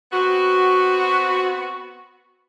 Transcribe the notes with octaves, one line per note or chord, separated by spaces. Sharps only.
B3 C4 F#4